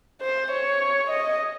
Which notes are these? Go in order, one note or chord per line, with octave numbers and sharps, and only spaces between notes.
C5
C#5
D#5